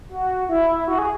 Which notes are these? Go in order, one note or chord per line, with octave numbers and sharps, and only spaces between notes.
F#4
E4
F#4
G#4